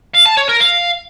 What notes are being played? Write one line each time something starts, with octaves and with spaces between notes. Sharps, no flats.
F5
A5
C#5
A#4
F5